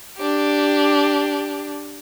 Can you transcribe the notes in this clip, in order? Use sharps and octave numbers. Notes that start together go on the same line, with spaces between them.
D4 G4